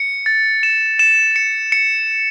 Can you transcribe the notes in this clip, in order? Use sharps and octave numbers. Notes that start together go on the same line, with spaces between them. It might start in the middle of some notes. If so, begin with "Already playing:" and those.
Already playing: C#7
A6
E7
E7
C#7
C#7